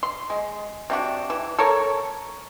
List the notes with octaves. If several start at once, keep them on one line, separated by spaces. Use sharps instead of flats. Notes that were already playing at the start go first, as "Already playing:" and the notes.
C6
G#3
C3 D4 F#4
E3
A4 A#4 C#5